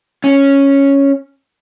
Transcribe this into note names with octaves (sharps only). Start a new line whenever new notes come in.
C#4